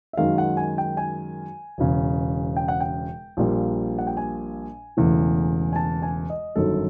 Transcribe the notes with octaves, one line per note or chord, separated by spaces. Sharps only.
E5
F#2 D#3 G#3 F5
F#5
G#5
G5
G#5
E1 E2 C#3
G5
F#5
G5
A#1 A#2 G3 A#3
F#5
G5
G#5
E1 E2 C#3 E3 A3
G#5
A5
G#5
D#5
G1 F#2 D#3 A4